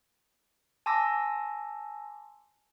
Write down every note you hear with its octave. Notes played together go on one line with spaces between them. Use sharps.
G#5 A5 C6 D6 E6 A#6